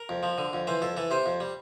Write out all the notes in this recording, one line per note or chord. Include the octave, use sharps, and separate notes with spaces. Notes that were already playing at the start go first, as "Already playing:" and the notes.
Already playing: A#4
F2
F3
D3
F2
E3 C5
F2 A4
E3 A4
C3 C5
F2
G3